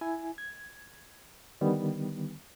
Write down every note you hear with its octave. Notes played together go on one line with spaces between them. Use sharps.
E4 G#5
G#6
D3 D#3 G3 B3